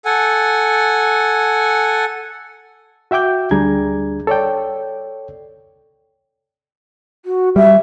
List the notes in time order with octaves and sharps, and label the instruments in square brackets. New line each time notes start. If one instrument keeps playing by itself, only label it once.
[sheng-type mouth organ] A4 F#5 G#5
[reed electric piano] F#4 E5 G5 D6 G6
D2 G3 D4 G#4 A#5 G#6
A4 C#5 D5 G5
[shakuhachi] F#4
[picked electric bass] G3 [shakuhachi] E5